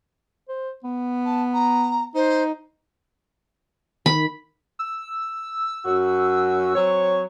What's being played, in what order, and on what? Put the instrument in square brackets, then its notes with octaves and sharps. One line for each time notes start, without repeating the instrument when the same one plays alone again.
[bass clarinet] C5
B3
[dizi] A5
A#5
[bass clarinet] D#4 [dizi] C5
[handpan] D#3 [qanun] B5
[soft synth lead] E6
[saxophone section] F#2 F#4
F#3 C4 C#5